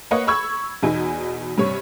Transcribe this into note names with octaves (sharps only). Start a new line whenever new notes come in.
A#3 B4 C#5 D#5 F#5
B5 C#6 E6 G#6
E2 B2 D#4 G#5
G2 C3 C#5